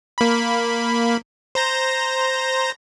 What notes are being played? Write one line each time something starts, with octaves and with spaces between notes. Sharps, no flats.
A#3 B5
C5 A#5 A#6